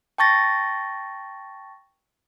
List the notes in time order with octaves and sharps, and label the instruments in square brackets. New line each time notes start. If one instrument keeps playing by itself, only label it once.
[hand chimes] G5 A5 C#6 A6 A#6